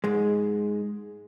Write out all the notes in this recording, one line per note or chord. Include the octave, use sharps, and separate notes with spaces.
G#2 G#3